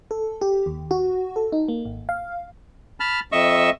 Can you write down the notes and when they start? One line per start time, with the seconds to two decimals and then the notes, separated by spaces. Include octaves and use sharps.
0.11 A4
0.41 G4
0.66 D#2
0.91 F#4
1.36 A4
1.52 D#4
1.68 A#3
1.85 G#1
2.09 F5
3.00 A5 B5 F6
3.32 F2 D#5 E5 C#6 E6